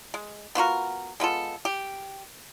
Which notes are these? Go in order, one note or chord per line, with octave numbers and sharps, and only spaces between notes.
G#3
B3 F4 F#4 A#4
G#3 B3 F4 A4
G4